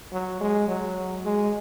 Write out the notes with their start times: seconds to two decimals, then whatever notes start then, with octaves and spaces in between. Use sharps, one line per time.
0.12 F#3
0.41 G#3
0.68 F#3
1.24 G#3